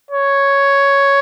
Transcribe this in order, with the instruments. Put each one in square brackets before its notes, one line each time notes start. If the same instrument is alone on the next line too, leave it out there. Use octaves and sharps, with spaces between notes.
[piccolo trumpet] C#5